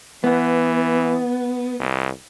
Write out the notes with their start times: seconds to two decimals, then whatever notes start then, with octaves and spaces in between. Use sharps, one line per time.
0.24 E3 B3
1.80 C2